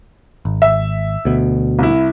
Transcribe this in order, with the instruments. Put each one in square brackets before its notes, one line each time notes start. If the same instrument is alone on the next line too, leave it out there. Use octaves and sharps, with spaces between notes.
[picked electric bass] G#1
[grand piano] E5
[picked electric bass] D2 B2
[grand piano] C2 E4